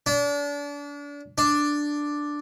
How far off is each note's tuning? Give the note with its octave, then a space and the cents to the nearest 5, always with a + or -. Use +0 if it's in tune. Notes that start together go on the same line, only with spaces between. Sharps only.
D4 -35
D4 +0